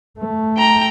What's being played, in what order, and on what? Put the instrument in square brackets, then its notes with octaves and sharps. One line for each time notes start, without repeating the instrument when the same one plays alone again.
[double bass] A3
[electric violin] G5 A#5